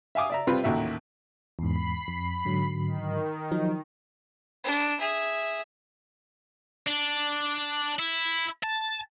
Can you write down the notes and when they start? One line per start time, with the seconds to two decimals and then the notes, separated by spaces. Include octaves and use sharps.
0.15 E5 F5 G#5 D6 D#6
0.30 D5 E5 A#5
0.47 C3 G3 C4 F4 B4
0.64 A1 D#2 A#2 F#4 E5
1.59 E2 G#2 B5 C7
2.08 F2
2.45 G#2 D3 F#3
2.86 D#3
3.51 F3 F#3 D#4
4.64 D4
4.98 G#4 E5
6.87 D4
7.99 E4
8.64 A5